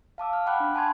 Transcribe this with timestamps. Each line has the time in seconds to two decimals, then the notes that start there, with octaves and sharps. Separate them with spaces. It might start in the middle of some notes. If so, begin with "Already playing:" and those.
0.18 F5 A5 D6 E6
0.33 F6
0.46 F#5 G5 B5 D6 F#6
0.60 D4
0.75 G#5 A5 B5 C6 G#6